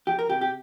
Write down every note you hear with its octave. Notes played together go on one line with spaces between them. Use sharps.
F2 G4
A#4
C3 G4
G4